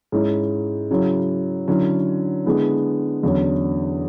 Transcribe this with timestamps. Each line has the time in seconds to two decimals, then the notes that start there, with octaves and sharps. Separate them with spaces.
0.12 G#2 G#3 C#4 E4
0.90 C#3 F#3 C#4 E4
1.68 D3 F#3 C#4 E4
2.46 D3 G#3 B3 E4
3.23 E2 D3 F#3 C#4